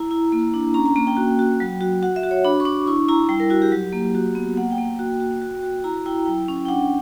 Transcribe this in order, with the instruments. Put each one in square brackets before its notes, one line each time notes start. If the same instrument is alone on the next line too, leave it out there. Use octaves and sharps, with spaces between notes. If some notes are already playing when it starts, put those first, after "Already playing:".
Already playing: [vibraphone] E4 A#5
E4
A#3
D4
C#4 A#5
A#5
A#3 A#5
G5
F#4
F#4
F#3
F#4
F#4 F#5
E5
F#4
C#5
D4 B5
C#6
D4 D6
E4 C#6
E4 A#5
G3 G5
A#4
E4 F#4
G4
F#3
A#3
F#4
B3
A#3 F#5
G5
A#3
G5
F#4
F#4
F#4
F#4
E4 A#5
E4 G5
F#3 G5
C#4
G5
D4 F#5